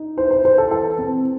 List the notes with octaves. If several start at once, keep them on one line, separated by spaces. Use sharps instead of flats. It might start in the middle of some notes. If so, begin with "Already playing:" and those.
Already playing: D#4
E4 C5
C5
E4 C5
A4
E3 A4
C4